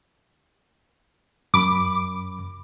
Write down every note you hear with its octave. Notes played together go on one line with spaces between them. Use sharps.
F#2 B5 D6